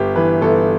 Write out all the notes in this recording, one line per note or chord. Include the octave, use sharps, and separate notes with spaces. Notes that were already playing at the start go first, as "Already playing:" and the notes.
Already playing: G1 G4
E3 B4
G1 A4